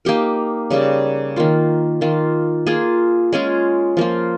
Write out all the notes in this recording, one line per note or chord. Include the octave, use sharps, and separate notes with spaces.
A#3 D#4 G4 A#4
C#3 G3 A#3
D#3 A#3 F4
D#3 A#3 F4
A#3 F4 G#4
G#3 C#4 F4 G#4
F3 A#3 F4